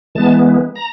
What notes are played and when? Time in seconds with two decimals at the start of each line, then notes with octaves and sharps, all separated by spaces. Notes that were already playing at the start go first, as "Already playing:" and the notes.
0.15 E3 G#3 B3 A5
0.75 A#5